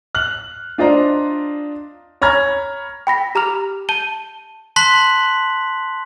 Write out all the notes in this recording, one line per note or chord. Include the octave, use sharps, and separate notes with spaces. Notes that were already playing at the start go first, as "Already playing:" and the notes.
F6 F#6 F#7
D4 F4 C5 D5 D#5 A#5
C#5 A#5 B5 F6 G#6
G5 B5 A#6 B6
G4 A#5 D6 F6 F7
A5 G6 D#7 G7
A5 C6 F#6 B6 F#7